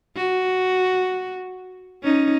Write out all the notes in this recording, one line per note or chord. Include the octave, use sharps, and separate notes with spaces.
F#4
C#4 D#4